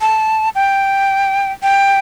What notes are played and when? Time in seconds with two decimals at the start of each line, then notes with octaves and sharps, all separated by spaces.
0.01 A5
0.55 G5
1.63 G5